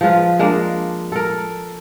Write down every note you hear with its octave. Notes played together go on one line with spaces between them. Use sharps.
F3 G#3 F4 B4
G#3 A#3 D4
A4 A#4